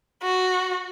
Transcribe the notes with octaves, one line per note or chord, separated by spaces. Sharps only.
F#4